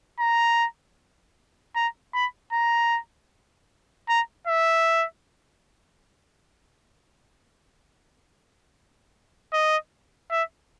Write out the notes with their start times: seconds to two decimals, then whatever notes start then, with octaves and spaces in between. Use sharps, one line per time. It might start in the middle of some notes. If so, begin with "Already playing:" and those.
0.20 A#5
1.76 A#5
2.14 B5
2.53 A#5
4.09 A#5
4.47 E5
9.53 D#5
10.31 E5